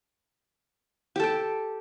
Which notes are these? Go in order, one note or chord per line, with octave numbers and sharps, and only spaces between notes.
G4 A4 G5